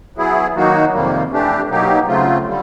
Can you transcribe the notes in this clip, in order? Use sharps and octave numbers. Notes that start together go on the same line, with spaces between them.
F#3 B3 E4 G#4
D#3 F#3 A#3 D#4 F#4
F2 C3 D#3 G3 A#3
E3 A3 D4 G4
B2 F#3 A#3 D#4 G4
C#3 F#3 A3 C4 F4
D3 G3